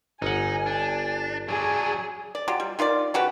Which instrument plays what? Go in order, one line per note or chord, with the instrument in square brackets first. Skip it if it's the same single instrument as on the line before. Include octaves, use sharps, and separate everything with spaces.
[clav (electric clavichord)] G1 F#5 [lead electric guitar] D#4 [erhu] G#5
[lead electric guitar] D4
[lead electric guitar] F#3 D4 [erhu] G#4
[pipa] D5
F#3 F4 G4
G3
D#3 F4 G4 D5
C#3 F#4 G4 B4